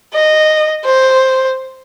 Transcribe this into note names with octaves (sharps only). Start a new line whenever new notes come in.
D#5
C5